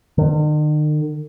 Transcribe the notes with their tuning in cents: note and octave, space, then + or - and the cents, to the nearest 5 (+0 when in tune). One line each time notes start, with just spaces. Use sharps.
D#3 -45